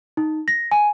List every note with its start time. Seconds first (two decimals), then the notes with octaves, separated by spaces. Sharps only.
0.17 D#4
0.48 A#6
0.71 G#5